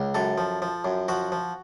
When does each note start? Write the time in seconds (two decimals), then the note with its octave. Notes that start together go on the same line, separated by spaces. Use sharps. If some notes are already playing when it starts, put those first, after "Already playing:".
Already playing: C#2
0.15 F#2 A4
0.38 F3
0.62 F3
0.85 F#2
1.08 F3 F#4
1.32 F3